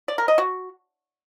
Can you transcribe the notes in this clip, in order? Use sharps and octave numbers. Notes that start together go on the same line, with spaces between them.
D5
A#4
D#5
F#4